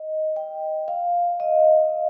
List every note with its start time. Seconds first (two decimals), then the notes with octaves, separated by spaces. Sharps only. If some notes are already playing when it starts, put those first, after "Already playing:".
Already playing: D#5
0.36 G5
0.88 F5
1.40 D#5